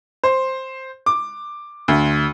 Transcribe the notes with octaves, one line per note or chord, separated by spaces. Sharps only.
C5
D6
D2